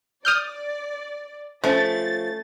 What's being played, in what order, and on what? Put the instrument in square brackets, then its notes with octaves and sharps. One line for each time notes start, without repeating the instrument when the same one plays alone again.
[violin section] D5 [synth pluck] D#6 F6 G6
[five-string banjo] F3 [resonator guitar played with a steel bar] A3 C#4 [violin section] A6